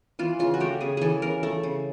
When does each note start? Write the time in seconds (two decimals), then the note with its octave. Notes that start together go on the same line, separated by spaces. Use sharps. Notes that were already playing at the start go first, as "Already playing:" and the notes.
0.19 E3 F4
0.39 C#3 F4
0.54 F#4
0.60 A3 G4
0.81 C#3 G#4
0.97 E3 G#4 A4
1.22 C#3 A#4
1.43 A3 A4
1.63 C#3